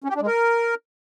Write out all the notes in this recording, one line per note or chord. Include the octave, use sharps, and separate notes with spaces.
C#4
G4
D4
G#3
A#4